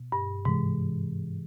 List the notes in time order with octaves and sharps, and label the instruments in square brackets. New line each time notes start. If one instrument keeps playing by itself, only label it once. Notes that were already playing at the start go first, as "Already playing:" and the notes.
Already playing: [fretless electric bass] B2
[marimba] G2
[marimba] G#2 [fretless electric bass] C3 E3 G#3